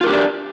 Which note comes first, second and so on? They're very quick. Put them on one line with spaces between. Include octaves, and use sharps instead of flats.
F4 A#4 G4 D4 D5